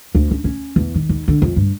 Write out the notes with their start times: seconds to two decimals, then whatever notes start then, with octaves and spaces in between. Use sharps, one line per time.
0.15 D2
0.31 C#4
0.44 C#4
0.76 E2
0.95 D#3
1.09 D#2
1.28 D3
1.42 F2
1.56 G2